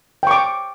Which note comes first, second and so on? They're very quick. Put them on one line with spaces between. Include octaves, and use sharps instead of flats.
G5 C#6 D6